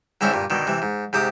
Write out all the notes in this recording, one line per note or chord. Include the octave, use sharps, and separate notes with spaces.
G#2 D3 C4 C#4 E4
G2 A#2
B2 D3 D#3
C3 E3
G#2
G#2 C3 G4 D#6